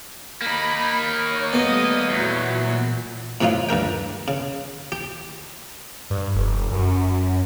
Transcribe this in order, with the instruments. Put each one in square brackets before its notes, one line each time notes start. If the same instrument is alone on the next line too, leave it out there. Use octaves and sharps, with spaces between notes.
[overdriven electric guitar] A#3 D#4 [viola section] B5
[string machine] C#5 C#6
[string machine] G3 A3 [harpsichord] B3 [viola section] D#5
[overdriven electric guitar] E2 [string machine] A#2 [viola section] F#3
[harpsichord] A2 C3 F#3 D#4 F4
G2 D3 A#4 G5
C#3
G4
[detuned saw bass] G2
F1
F#2